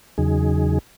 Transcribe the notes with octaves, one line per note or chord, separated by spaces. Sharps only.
E2 C#3 F#3 D#4 G#4